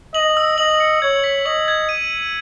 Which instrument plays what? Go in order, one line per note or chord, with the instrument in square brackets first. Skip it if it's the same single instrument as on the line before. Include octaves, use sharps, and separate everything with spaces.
[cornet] D#5 [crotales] F#7
[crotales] E6
[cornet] D#5 [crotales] F#7
[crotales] C#7
[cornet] C#5 [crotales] G#6
[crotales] B6
[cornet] D#5 [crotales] F#7
[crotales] G#6
D#7